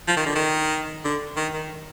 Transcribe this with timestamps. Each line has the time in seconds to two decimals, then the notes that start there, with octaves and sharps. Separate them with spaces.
0.08 F3
0.17 D#3
0.26 D3
0.35 D#3
1.05 D3
1.37 D#3
1.53 D#3